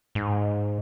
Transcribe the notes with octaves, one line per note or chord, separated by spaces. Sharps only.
G#2